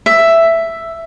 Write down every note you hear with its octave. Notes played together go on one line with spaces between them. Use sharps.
E5